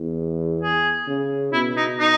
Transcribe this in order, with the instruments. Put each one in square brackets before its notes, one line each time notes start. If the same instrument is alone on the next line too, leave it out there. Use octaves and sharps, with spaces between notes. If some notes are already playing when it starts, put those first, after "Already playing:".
Already playing: [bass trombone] E2
[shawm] G#4
[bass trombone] C#3
[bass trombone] B2 [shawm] E4
[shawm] D#4
D#4